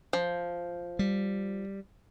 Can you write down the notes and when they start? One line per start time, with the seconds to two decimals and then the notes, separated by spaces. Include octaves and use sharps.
0.13 F3
0.99 G3